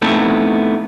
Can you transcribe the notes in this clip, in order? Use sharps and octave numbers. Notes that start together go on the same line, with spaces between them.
A3 B3 C4 D#4 E4 A4